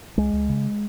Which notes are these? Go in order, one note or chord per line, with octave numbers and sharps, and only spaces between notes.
C#2 G#3
C#2
C#3